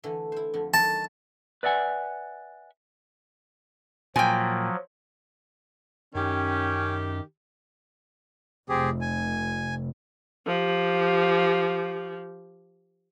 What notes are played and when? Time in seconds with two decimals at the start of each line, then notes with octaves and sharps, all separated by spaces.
0.04 D3 E3 A3
0.32 E4 C5
0.54 F2 D3
0.74 D#3 F#3 A5
1.63 B4 D5 E5 F#5 G#5
4.16 A#2 F3 F#3 G5 G#5
6.15 F#2 D#3 C#4 G4
8.69 F1 C4 G4 G#4
9.01 G#5
10.47 F3 G4